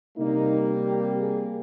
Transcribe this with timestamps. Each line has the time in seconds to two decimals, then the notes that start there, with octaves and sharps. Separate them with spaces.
0.17 C3 G3 A#3 D#4
0.87 G4
1.20 G#4